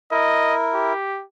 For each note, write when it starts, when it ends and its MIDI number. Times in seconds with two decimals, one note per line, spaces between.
0.11 0.93 64
0.11 0.93 70
0.11 0.55 75
0.74 1.23 67